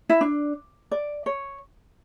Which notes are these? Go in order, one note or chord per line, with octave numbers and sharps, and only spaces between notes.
E4
D4
D5
C#5